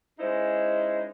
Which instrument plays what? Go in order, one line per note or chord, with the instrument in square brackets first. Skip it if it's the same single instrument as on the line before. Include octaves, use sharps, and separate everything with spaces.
[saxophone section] G#3 C#4 D#4 E4 C5